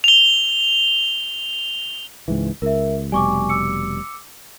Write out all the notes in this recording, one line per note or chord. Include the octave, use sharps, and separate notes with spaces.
F7 G7
C#2 G#2 E3
C#2 A#4 E5
F1 B2 G3 G#5 C#6 D6
D6 E6 C#7